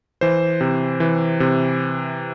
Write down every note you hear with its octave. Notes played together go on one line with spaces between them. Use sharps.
E3 C5
C3
E3
C3